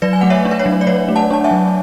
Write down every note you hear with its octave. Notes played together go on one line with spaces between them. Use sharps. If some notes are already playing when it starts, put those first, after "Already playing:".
F#3 B4 D5
G#5
A3 F#5
C#5 E5
D4
B4
C#5
F#3
D5
F#3 C#5
A3
F#5 A5
D4 A5
E5 G#5
F#3